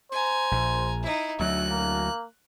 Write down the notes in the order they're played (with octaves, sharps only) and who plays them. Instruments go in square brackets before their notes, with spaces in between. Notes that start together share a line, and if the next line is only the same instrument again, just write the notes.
[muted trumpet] C5 [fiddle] G#5 A#5
[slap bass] A#1
[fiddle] D#4 E4
[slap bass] D2 F#3 [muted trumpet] E5 [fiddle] F#6
[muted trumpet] A#3